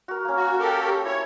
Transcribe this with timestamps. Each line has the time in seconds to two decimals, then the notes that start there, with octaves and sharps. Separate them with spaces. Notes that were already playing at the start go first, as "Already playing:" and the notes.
0.08 F#4 A#4
0.25 A#3 C#4
0.36 F#4
0.59 G4 A4 A#4
1.05 E4 C#5